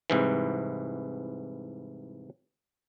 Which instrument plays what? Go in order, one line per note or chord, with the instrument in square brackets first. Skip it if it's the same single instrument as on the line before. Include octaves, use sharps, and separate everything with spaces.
[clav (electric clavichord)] C2 G#2 E3